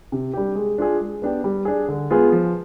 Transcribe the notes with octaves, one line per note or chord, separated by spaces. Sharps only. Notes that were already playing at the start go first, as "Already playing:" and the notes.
C3
G3 D4 G4
G#3
D4 F4 G#4
G#3
B3 D4 G4
G3
D4 G#4
D3
G#3 B3 F4 G#4
F3